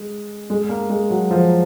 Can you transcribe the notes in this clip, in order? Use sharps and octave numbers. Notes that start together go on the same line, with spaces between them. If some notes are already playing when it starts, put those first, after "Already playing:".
Already playing: G#3
G#3
A#3
G#3
F#3
F3